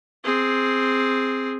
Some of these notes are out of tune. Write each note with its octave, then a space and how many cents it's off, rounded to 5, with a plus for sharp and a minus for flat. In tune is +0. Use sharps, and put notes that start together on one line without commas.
C4 +0 G#4 +0